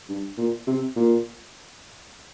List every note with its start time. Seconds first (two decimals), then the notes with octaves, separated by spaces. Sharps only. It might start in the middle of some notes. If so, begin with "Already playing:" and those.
0.09 G2
0.38 A#2
0.67 C3
0.96 A#2